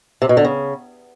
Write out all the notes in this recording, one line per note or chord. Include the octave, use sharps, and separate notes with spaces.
C3
B2
D3
C#3